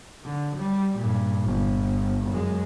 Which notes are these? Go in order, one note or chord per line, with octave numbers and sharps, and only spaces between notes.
D3
G3
G2 A#2
G1
F#2 G#3